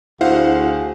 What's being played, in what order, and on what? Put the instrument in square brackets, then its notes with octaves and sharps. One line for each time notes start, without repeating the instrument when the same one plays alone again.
[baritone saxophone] D2 [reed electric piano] E4 [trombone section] F#4 G#4 [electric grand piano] C5 F5 F#5